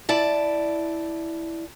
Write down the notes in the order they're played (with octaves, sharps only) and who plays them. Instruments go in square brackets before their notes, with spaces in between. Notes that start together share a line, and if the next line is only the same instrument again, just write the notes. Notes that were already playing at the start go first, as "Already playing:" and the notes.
[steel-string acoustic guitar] E4 D5 A5